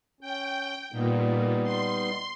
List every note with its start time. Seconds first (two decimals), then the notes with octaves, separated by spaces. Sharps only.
0.21 C#4 G5
0.92 A#2 G3 B3 D#4
1.63 C6